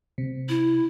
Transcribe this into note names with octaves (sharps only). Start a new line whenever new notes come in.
C3
E4